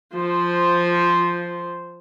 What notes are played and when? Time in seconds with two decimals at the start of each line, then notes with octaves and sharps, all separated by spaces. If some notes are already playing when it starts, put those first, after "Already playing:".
0.14 F3 C5